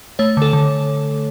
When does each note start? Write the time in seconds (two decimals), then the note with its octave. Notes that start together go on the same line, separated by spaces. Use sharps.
0.19 A3 C#5
0.37 D3 A4
0.53 D3